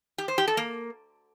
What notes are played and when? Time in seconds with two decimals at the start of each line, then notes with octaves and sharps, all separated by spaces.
0.18 G4
0.28 C5
0.38 G4
0.48 A4
0.57 A#3